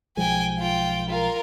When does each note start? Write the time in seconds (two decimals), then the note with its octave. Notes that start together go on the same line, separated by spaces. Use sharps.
0.17 B1 F3 G#3 G5 G#5
0.59 F4 G5
1.09 F4 A#4